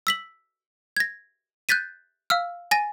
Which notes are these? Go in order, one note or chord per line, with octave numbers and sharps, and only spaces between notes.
E6 B6 F#7
G#6 A#6
F#6 G6 A6 B6 D#7
F5 E6 F6
G#5 A6 A#6 D#7